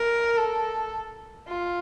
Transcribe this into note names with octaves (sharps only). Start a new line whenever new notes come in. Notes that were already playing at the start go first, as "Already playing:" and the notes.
Already playing: A#4
A4
F4